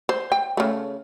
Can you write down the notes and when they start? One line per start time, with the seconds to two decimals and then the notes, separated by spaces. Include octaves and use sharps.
0.09 C5
0.32 G5
0.57 C#3 A3